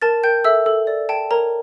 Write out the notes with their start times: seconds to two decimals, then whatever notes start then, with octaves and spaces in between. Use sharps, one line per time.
0.02 A#4 A5 A6
0.24 A#4 G5 G6
0.44 A4 E5 E6
0.66 A4
0.87 D5
1.09 G5 A5
1.31 A#4 C#5 A#5